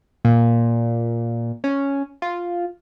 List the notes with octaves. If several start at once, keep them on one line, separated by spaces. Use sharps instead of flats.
A#2
C#4
F4